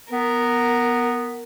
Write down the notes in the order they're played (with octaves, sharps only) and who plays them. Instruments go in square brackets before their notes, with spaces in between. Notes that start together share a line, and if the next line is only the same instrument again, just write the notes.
[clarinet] B3 [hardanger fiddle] A#4